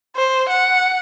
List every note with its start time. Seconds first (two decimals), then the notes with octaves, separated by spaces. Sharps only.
0.16 C5
0.48 F#5